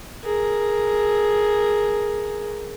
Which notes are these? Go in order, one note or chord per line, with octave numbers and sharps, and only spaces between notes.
G#4 A#4